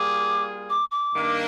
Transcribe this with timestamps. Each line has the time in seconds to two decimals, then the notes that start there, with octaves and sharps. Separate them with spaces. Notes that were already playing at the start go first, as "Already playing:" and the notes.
Already playing: G3 A#3 F4 G#4 D6
0.70 D6
0.91 D6
1.13 G2 D#3 A#3 D4